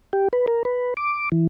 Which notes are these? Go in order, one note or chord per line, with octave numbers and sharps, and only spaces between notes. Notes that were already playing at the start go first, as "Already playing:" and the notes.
G4
B4
A#4
B4
D6
E3